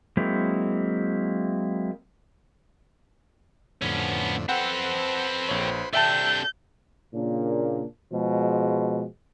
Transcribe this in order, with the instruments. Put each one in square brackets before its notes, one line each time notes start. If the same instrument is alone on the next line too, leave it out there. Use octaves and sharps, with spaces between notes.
[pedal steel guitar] F#3 G#3 A#3 C4 E4
[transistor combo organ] F2 A2 D3 [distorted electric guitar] B3 C#4
[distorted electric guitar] C4 A4 [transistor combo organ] B4 C5 [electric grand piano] F#5 G5
[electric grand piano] A#1 C#5
[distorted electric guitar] C3 D4 [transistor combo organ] A4 [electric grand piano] E5 G5 A5 [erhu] G6
[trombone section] A#2 C#3 A#3 D4
B2 F3 G#3